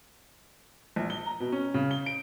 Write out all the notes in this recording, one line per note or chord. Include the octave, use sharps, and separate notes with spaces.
A#1
G7
A#5
B2
C#4
C#3
G7
D7